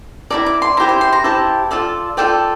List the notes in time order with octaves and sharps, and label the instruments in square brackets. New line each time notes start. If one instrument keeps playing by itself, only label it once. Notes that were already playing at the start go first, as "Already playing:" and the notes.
[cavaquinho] E4 A4 D5 A#5
D6
C6
E4 G4 C5 A#5
C6
C6
A#5
E4 G4 C5 A5
F4 A4 D5
F4 A4 D5 G5